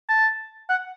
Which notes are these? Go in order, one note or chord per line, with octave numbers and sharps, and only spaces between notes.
A5
F#5